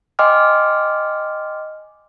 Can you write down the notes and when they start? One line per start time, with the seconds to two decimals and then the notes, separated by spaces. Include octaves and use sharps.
0.19 D#5 G5 G#5 C6 D6 F6